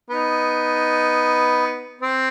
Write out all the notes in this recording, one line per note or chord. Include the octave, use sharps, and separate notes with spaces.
B3 D#4
C4